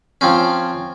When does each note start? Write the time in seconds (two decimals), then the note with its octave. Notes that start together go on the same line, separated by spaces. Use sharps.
0.21 F3 C4 C#4